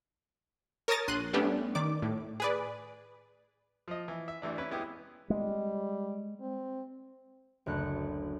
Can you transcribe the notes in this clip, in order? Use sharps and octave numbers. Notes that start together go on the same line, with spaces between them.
A#4 C#5 A5 D#6 A6 A#6
A#1 C6 F#6 D#7
G3 A3 B3 C#4 D4 G4
D#3 D5 D6
A2
G#4 B4 D5
F3 D#5
E3
E5
A1 E3 D4
C#4 E4 B4
G#3 B3 E4 G4 G#4
G3 G#3
C4
F#1 D2 F#6 C#7